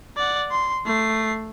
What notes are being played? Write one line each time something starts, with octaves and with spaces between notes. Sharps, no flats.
D5 F#5
C6
A3 C7